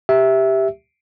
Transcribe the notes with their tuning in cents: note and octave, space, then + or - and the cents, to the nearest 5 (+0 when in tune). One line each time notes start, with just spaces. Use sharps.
G4 +0 E5 -5